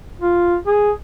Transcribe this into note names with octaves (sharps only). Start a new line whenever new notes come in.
F4
G#4